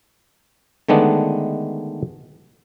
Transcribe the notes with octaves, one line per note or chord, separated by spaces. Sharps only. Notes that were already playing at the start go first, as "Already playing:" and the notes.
D3 D#3 G#3 A3 B3 D4